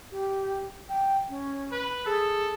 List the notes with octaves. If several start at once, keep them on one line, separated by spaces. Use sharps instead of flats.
G4
G5
C#4
B4
G#4 A4